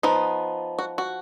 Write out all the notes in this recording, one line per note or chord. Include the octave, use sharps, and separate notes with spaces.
F3 B3 D#4
F#4
F#4